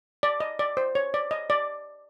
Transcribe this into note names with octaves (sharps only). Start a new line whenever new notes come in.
D5
D#5
D5
C5
C#5
D5
D#5
D5